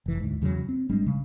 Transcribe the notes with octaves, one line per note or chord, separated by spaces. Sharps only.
F1 E3
D2 G#2
E2 C#3 F3 F#3
C4
G#1 G3 G#3 D4
C#3